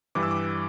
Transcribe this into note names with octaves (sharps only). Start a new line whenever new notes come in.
G2 E3 G3 D6
E6
D6